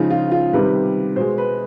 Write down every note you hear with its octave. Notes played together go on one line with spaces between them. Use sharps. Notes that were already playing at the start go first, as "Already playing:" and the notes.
Already playing: C#3 F3 G#3 D#4
F4
F4
C3 D#3 G3 B4
B2 G#3 C5
B4